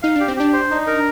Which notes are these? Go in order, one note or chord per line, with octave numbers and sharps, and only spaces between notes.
D#4 F5
D4 G4
C4
D4 G4
C5
D#4
A#4